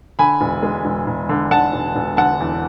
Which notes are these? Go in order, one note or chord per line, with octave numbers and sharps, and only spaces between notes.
D3 G#5 B5
E1
G#3
E1
E1
D3
D3 F#5 A5
E1
E1
D3 F#5 A5
E2